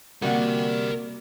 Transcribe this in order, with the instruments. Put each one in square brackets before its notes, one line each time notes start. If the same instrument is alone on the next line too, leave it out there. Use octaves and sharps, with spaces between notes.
[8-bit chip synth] C3 G3 [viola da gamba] A#3 [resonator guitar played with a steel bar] F#4 D5 F#5 [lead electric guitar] A#4 G5